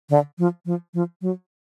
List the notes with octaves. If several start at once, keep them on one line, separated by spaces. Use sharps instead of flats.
D3
F3
F3
F3
F#3